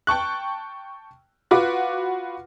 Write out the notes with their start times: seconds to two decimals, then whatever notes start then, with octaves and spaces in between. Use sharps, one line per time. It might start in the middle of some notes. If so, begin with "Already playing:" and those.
0.07 G5 A5 C#6 F#6
1.51 F4 F#4 B4 B5 D6